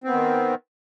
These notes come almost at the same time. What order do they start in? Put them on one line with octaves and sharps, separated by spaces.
C4 B3 D#3